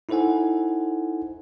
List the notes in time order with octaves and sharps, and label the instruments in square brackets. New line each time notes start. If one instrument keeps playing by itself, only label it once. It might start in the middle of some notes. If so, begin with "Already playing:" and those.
[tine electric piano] D#4 E4 A4 C5 F#5 G#5